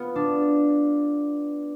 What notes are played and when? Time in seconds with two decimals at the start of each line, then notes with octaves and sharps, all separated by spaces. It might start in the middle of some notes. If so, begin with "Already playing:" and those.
Already playing: B3 F4
0.16 D4